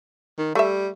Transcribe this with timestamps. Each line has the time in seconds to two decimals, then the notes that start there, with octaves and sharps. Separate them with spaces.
0.39 D#3
0.55 G3 A3 E5